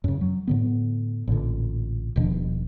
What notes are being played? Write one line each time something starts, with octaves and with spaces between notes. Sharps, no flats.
F#2 C#3
F#3
A2 D3 B3
A1 A#2 D3
D#1 B2 F3 D4